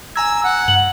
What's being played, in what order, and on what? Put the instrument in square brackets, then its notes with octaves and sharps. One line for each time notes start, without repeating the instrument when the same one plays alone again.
[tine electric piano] G#5 A#5 G#6 [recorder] E6
[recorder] F#5
[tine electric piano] G2 [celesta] F#7